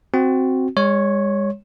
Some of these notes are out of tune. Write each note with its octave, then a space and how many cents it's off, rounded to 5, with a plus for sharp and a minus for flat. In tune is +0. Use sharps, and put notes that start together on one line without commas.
C4 +0 F#4 +0
G#3 -40 C#5 +0 C6 +45